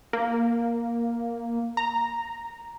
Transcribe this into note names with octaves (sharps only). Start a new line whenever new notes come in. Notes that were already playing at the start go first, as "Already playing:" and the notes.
A#3
A#5